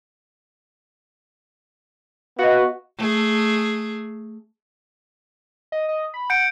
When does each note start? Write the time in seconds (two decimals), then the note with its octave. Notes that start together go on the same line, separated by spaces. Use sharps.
2.39 B3 F#4 D#5 F5
2.98 A3 G#4
5.72 D#5
5.89 D#5
6.14 B5
6.30 F#5 G6 C#7 D7